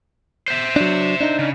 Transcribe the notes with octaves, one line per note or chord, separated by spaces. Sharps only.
C5 E5
F#3 D4
D4 D#4
C#3